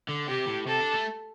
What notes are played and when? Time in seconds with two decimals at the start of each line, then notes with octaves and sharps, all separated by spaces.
0.09 D3
0.28 C3 G4
0.47 A2
0.67 C3 A4
0.81 D4
0.94 A3